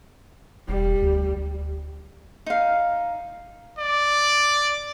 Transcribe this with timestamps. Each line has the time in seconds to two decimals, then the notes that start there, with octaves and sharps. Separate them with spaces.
0.68 E1 G3
1.02 D2
2.46 D#4 F5
3.79 D5